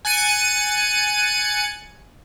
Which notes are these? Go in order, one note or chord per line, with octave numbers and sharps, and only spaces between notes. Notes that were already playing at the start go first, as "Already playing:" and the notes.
G#5 F#6 A6 C#7 D#7